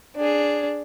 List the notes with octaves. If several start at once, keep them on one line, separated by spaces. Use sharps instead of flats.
D4 G#4